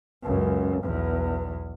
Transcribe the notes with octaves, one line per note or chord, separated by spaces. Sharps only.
C#2 F#2
B1 E2